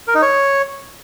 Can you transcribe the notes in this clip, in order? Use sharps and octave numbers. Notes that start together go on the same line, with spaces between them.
A#4
D#4
C#5